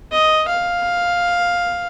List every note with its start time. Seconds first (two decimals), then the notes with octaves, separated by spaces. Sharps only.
0.12 D#5
0.48 F5